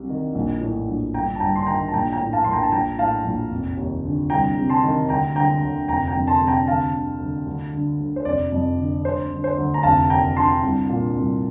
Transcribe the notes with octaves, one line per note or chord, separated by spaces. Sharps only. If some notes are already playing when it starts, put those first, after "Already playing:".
Already playing: C2 C3
D#3
A#1
A2
A#1
G1 G5 A#5
A5
G2 G5 A#5
C6
D#3 G5 A#5
A5
A#1 G5 A#5
G5 A#5
A2
F5 A5
A#1 C6
G5 A#5
A5
A#1 G5 A#5
A2 F5 A5
A#1
F1
D#2
D3
C2 G5 A#5
C3
A5 C6
D#3
D2 G5 A#5
D3 G5 A#5
D2
F1 G5 A#5
G5 A#5
F2
A5 C6
C3
G5 A#5
D2 F5 A5
D3
D2
D2
D3
D2
C5
F1 D5
F2
D3
D2 C5
D3
C5
D2
A#5
F1 F5 A5
D#2 G5 A#5
D3 A5 C6
C2
A#2
C2